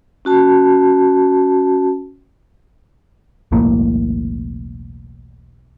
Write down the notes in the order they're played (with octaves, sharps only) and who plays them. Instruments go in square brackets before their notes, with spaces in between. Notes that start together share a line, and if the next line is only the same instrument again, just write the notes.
[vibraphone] C#4 F#4 A5
[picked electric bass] E1 B1 A2 A#3